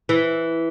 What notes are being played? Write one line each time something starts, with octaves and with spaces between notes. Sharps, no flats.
E3